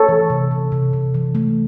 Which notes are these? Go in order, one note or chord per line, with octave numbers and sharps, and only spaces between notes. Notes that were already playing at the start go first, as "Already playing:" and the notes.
Already playing: A4 C#5
E3
C3
C3
C3
C3
E3
A3